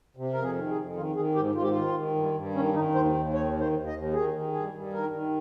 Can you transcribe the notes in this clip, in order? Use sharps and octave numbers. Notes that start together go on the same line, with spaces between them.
C3
F2 A#4
G#4
D#3
G#4
F2
D#3 F4
D#3 G#4
G#2 G4
G#2 F4
G4
F4
D#3
D#3
G2
G2
D#3 C#4
D#3 D#4
D#2 C5
D#2
D#3 C#5
D#3
C5
D#2
D#5
D#2
D#3 G#4
D#3
G2 G#4
G2
D#3 A#4
D#3